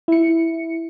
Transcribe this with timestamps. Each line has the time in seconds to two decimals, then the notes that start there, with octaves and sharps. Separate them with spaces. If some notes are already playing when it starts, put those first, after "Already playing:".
0.08 E4 C#7